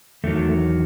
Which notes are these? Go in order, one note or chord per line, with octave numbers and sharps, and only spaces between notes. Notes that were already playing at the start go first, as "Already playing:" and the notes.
E2 D#3 F#3 A3